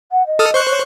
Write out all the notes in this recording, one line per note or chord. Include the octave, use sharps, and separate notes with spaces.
F#5
D#5
A4 D#6 F6
C5 C#6 F#6
C#5